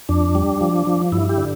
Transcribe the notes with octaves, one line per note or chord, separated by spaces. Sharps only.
F2 D4
G3
F3
F3
G2 E4
E4 G4
D3